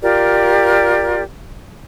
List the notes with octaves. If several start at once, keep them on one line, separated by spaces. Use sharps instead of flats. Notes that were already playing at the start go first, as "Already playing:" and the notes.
F4 G4 A#4 D5